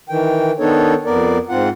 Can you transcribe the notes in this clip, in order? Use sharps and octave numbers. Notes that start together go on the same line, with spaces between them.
D#3 E3 G5
D#3 B3 D4 D#4 A4 C#5
F2 B3 A#4 D5
G#2 C4 F4 F#5